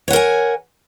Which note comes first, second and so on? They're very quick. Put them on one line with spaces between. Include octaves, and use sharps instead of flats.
C#5 F#5 A#4 G#5